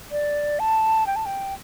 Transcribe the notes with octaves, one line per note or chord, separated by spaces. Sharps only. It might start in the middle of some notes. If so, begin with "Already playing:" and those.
D5
A5
G5
A5
G5